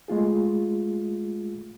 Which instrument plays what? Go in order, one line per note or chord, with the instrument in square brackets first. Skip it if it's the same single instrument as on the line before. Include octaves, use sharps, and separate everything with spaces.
[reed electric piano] G#3 A3 F4 G#4